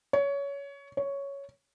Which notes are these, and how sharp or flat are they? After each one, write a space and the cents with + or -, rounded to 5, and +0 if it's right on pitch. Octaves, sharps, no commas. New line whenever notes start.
C#5 +20
C#5 +5